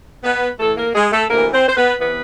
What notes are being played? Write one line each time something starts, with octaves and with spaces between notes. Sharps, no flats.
B3 B4
A2 E3 A3 A4
A#3 A#4
G#3 G#4
A3 A4
D2 C3 E3 A#3 A#4
C4 C5
C5
B3 B4
C3 E3 B3 B4